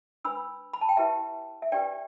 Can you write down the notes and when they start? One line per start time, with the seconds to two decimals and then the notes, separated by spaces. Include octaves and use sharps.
0.25 D4 B4 B5 E6
0.73 B5
0.81 A5
0.89 G5
0.97 E4 G4 B4 E5 A5
1.62 E5
1.72 D4 G4 B4 D5 G5